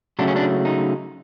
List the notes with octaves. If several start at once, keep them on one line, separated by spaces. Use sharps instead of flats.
C#3 F#3 A3 D4
C#4
D4
D#4